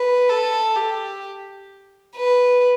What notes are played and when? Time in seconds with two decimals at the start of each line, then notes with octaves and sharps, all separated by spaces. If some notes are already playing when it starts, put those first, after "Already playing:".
Already playing: B4
0.29 A4
0.75 G4
2.16 B4